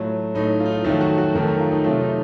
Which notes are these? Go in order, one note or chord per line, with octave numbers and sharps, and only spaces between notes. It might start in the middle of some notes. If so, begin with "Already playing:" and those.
Already playing: A2 F#3 A3 F4
A2 F#3 A3 D#4
F4
D#4
F4
F2 D#3 F#3 A3 D#4
F#4
F#4
F2 D#3 F#3 A3 A#4
A#4
F4
D#4
C3 F#3 A3 F4
D#4